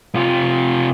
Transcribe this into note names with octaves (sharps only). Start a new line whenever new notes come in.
C3 F4